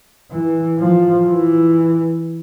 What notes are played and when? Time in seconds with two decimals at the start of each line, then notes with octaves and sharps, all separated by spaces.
0.31 E3
0.78 F3
1.27 E3